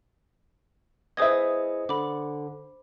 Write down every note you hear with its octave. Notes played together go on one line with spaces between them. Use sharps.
B3 E4 G#4 C5 D#5 E5 D#6 G#6
D3 B5 D6